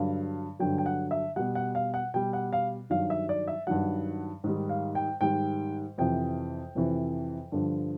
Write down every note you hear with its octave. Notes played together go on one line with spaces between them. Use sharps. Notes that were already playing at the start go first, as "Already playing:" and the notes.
Already playing: G2 D3 F#3 F5
G2 D3 F#3 G5
G5
F#5
E5
B2 G3 F#5
F#5
F5
F#5
B2 G3 G5
F#5
F5
G2 D#3 F#3 F5
E5
D5
E5
G2 D#3 F#3 F#5
G#2 D#3 G3
F5
G5
G#2 D#3 G3 G5
F2 C3 E3 G5
F2 C3 E3
G2 D3 F3